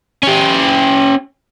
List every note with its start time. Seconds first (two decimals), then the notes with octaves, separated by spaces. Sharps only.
0.23 C#4 G4